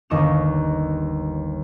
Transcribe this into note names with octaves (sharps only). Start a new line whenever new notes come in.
G1 D#2 D#5 C#6 E7